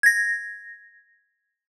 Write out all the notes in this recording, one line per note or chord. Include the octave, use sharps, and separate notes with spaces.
G#6 A#6